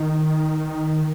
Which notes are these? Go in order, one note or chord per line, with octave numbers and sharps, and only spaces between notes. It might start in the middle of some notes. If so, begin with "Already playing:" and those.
Already playing: D#3